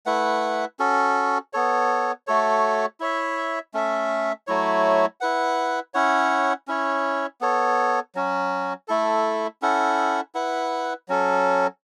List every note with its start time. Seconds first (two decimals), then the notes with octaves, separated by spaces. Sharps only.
0.06 A3 E4 B4 F#5
0.79 C#4 F#4 A4
1.53 B3 A4 C#5
2.27 A3 F#4 A4 C#5
3.00 E4 C#5 E5
3.74 A3 C#4 A4 E5
4.47 F#3 A3 E4 C#5
5.21 E4 B4 F#5
5.94 C#4 E4 C#5 F#5
6.67 C#4 E4 C#5
7.41 B3 A4 C#5
8.15 F#3 C#4 F#4
8.88 A3 E4 A4
9.62 C#4 E4 A4 F#5
10.35 E4 B4 F#5
11.08 F#3 C#4 A4